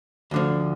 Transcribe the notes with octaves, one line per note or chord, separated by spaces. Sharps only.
D2 D3 F3